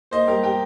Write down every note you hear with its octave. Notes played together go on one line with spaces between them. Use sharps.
A#3 C5 D#5
G3 G4 A#4
G4